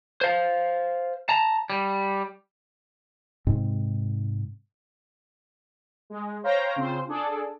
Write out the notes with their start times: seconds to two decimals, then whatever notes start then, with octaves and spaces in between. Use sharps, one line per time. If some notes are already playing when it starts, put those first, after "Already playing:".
0.21 C5 F5
1.29 A5 A#5
1.70 G3
3.47 G#2 C3 G#3 C4
6.10 G#3
6.43 C5 C#5 F5 G5 A#5
6.76 C#3 C4 F4 C5
7.08 D4 G#4 A4 D5